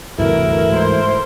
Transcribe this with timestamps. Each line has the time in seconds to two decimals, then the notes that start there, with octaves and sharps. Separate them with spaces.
0.18 D2 G2 C3 E3 A3 E4 F#4 A#4
0.70 G#2 A#4 C5